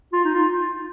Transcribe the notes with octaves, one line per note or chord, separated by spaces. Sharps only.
F4
D#4
F4